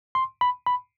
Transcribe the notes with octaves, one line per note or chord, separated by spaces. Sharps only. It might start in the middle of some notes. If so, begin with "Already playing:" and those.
C6
B5
B5